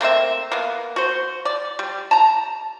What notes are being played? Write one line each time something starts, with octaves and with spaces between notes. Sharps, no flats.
A3 A#3 C4 E5
A#3 B3
F#4 C5
D5
G3
A5 A#5